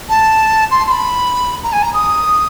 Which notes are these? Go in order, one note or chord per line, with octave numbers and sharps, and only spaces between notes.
A5
C6
C6
B5
A#5
G#5
A#5
D#6